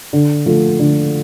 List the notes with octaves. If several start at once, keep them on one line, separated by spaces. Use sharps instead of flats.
D3
F3 A3
D3